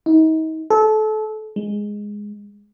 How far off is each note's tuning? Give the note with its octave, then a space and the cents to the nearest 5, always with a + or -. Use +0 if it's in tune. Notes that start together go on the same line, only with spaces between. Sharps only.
D#4 +35
A4 -25
G#3 -5